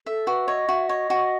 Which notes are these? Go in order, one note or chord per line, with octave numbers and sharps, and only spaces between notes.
A4 E5
F#4 B4
C#5 D#5
F#4 E5
C#5 D#5
F#4